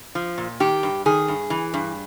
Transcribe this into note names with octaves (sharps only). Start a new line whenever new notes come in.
F3
A#2
D#3 G4
G2
D#3 G#4
G2
E3
G2